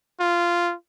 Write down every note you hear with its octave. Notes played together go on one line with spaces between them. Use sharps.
F4